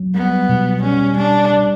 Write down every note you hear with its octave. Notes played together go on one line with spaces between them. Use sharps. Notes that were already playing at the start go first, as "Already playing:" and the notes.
Already playing: F#3
G3 B3
B2
G3 C#4
G3 D4
G3